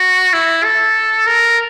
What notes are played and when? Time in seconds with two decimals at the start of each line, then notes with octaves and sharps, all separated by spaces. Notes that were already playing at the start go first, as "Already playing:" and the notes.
Already playing: F#4
0.33 E4
0.64 A4
1.27 A#4